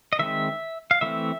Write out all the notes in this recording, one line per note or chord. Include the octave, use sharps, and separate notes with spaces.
D#5
D#3 G#3 C4 E5
F5
E3 A3 C4 E5